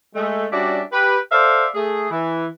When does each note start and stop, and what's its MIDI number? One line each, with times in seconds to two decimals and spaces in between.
0.15 0.46 56
0.15 0.46 57
0.52 0.81 55
0.52 0.81 61
0.52 0.81 62
0.52 0.81 66
0.52 0.81 74
0.52 0.81 76
0.92 1.18 67
0.92 1.18 71
1.32 1.67 69
1.32 1.67 72
1.32 1.67 74
1.32 1.67 76
1.32 1.67 77
1.74 2.08 57
1.74 2.08 68
2.11 2.46 52